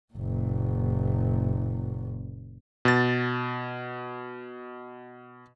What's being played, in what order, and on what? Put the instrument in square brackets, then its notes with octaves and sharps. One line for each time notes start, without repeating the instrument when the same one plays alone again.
[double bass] F#1 A#2
[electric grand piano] B2 A6